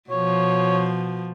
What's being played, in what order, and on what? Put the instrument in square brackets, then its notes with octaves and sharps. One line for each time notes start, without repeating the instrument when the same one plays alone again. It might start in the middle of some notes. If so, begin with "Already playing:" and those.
[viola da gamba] B2 F3 [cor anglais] C#5